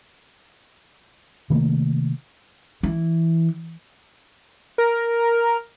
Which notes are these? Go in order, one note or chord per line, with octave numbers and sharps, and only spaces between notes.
C3 D#3 A3 A#3
E3
A#4